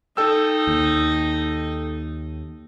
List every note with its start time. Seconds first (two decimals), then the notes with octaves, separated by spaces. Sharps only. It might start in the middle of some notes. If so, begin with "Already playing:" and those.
0.17 D#4 A4 G5 E6
0.67 D#2